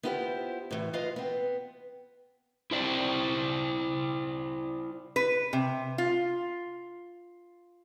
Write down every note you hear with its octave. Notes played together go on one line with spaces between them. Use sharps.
B3 E4 F4 G4 A4 C5
A2 E3
F4 B4 C5 D#5 F5
B3 C4
E4 C5 D5
B4
C3
F4